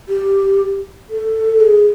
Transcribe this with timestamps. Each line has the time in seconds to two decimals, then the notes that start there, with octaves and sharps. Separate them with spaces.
0.09 G4
1.10 A4
1.60 G#4